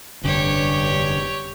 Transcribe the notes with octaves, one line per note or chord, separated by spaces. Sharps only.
F1 G2 D3 D4 G4 C#5